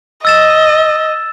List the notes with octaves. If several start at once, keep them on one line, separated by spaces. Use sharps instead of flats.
D#5 E6 A6 E7